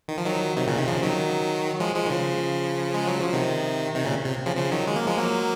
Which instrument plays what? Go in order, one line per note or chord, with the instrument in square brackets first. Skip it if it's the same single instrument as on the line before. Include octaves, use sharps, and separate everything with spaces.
[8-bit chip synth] D#3
F3
D#3 F#3
C3 D#3
A#2 C#3
C3 D#3
C#3 F3
D#3 F#3
F3 G#3
F3 G#3
D#3
C#3 F3
G#3
F#3
F3
C3 D#3
C3 D#3
A#2 C#3
C3
C#3 F3
C#3 F3
D#3 F#3
G#3
A#3
F3 G#3
F#3 A#3